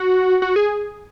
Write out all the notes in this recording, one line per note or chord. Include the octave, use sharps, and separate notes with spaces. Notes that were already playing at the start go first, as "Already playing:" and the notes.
Already playing: F#4
F#4
G#4